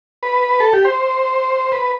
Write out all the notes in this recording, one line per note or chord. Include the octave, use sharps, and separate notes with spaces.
B4
A4
G4
C5
B4